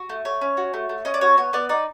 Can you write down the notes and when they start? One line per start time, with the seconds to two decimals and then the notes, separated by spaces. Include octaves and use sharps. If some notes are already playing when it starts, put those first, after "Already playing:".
Already playing: F#4
0.09 A3
0.25 A3 C#5
0.41 C#4
0.57 F#4
0.74 A3
0.89 A3
1.05 C#4 D#5
1.14 D5
1.21 F#4 C#5
1.37 B3 C#5
1.53 B3 D5
1.69 D#4 D5